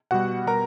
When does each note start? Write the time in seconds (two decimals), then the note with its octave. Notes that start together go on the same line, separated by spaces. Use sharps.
0.11 B2 G3 F#4 F#5
0.47 B2 G3 A#4 A#5